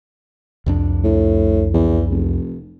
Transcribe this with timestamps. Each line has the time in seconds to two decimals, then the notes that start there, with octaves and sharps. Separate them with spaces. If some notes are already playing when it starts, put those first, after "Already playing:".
0.66 C2 F2 D4
1.04 A2
1.74 E2
2.10 F1